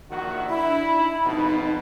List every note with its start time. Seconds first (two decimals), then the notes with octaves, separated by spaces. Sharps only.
0.11 A#1 D#3 D4 F#4 E5
0.49 E4 B5
0.88 D#4
1.25 G#1 F2 B2